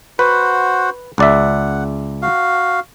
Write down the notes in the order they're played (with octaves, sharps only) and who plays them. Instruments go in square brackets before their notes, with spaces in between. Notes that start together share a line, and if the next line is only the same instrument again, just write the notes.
[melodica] F#4 C5 F#5 [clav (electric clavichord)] B4
[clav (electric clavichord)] C#2 D5 E5 [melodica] F#5
[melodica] F#4 F5